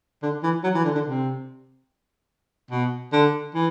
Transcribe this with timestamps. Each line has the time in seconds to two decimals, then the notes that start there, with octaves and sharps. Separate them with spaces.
0.23 D3
0.43 E3
0.64 F#3
0.74 E3
0.85 D3
0.95 D3
1.05 C3
2.71 B2
3.13 D3
3.54 E3